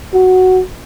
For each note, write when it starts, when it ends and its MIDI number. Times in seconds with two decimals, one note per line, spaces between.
0.13 0.62 66